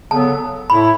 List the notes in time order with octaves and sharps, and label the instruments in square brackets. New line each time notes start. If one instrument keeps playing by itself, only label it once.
[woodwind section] C#3 F#3 B3 A4 [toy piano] A5
[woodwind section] A2 A3 E4 A4 [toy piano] B5